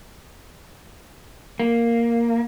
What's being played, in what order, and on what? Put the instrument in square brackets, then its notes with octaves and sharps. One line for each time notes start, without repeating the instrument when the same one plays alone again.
[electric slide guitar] A#3